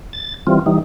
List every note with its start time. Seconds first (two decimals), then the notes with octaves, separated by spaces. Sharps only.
0.13 A6
0.47 E3 G3 C4 F4
0.66 E3 G3 D#4